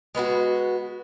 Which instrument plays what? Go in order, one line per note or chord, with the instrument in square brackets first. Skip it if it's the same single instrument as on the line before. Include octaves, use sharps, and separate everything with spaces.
[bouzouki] G#3 B3 E4 F#4